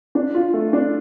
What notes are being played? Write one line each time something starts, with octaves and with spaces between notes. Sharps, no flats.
D4
F4
A3
D4